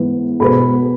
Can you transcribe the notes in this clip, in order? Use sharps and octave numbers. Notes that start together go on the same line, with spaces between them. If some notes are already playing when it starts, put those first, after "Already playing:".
Already playing: G#2 E3 B3
B2 G#3 B3 B5